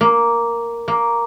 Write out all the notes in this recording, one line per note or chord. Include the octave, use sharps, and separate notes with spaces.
A#3
A#3